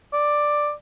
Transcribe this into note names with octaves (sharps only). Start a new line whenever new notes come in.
D5